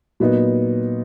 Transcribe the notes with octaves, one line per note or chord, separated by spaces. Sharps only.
A#2 F#3 B3 D#4